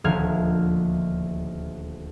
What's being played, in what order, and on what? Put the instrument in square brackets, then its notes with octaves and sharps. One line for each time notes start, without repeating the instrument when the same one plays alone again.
[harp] D#1 D2 F3 A#3 F6 G#6